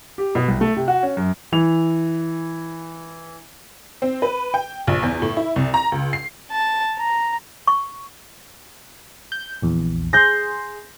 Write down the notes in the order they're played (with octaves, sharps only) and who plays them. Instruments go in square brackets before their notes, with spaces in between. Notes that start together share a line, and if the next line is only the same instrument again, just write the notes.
[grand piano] G4
B2
C2
A3
C3
F#4
C#4
F#2
E3 F7
[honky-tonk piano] C4
B4
G5
A#1
E2
A2
E4
C2
A#5
C#2
C7
[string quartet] A5
A#5
[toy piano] C#6
[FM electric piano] G6
A#1 E2
[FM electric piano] G#4 C6 [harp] G6 A#6